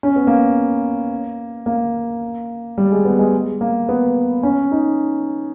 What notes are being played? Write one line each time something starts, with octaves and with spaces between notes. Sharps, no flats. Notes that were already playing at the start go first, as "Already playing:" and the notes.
C#4
B3
A#3
A#3
G3
G#3
B3
G#3
A#3
B3
C#4
D#4